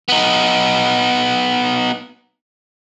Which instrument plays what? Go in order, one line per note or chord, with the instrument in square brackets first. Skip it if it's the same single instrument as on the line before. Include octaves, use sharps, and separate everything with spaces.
[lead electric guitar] B3 D#4